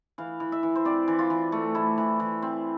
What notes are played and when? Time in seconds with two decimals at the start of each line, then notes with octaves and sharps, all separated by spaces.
0.18 E3 F5
0.40 E3
0.52 E5
0.63 E3
0.76 C5
0.85 C4 D5
1.08 E3
1.19 F4
1.30 E3
1.52 A3
1.75 A3 E4
1.98 E3
2.20 E3
2.42 C4